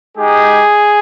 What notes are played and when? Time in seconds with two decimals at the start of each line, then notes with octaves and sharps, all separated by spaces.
0.17 G#3 D#4 G4 G#4